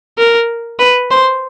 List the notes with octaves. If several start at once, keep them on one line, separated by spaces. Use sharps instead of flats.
A#4
B4
C5